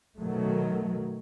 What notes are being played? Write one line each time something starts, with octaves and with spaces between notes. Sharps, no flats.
B2 D#3 F#3 A3